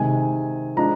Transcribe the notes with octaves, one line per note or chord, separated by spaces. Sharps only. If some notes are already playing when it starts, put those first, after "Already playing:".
Already playing: C3 D#3 G#3 G#5
F3 G#3 D4 A#5